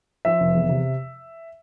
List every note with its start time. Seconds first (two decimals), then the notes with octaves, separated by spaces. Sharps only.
0.25 F3 E5
0.40 F1
0.55 E2
0.69 C3